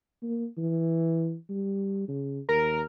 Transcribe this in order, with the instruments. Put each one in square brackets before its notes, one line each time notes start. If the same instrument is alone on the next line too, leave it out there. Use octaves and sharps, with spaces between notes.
[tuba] A#3
E3
G3
C#3
[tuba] D#2 [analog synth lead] A#4